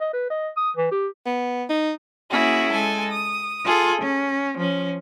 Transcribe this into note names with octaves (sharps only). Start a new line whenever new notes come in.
D#5
B4
D#5
D#6
E3
G4
B3
D#4
A#3 C#4 E4 F#4 G#4
G#3 A4 G#5
D#6
F4 G#4 A4
C#4
F3 C#4